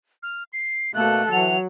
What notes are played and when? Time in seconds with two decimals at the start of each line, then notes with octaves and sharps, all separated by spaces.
0.23 F6
0.53 C7
0.94 B2 A3 A#3 A4 F#6
1.32 E3 F#3 F#5 F7